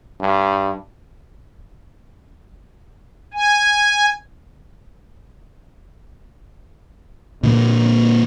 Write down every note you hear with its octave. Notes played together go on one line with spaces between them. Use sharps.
G2
G#5
A#2 D3 A#3